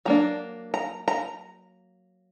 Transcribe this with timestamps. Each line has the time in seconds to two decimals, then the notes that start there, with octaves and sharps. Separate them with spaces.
0.05 F#3 A#3 D4 A#5
0.74 A#5
1.08 A#5